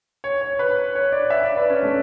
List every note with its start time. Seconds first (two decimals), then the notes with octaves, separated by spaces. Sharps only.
0.24 C#5
0.41 C#5
0.59 B4
0.95 C#5
1.12 D5
1.30 E5
1.44 D5
1.57 B4
1.70 C#4
1.83 A3